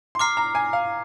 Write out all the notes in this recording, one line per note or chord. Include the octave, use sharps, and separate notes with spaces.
C6
A#5 D6 F6 C7
A#5
G#5
F5